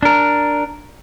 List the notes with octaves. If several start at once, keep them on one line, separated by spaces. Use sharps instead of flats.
D4 A#4